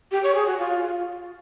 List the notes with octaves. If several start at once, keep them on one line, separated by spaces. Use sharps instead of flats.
G4
C#5
G#4
F#4
F4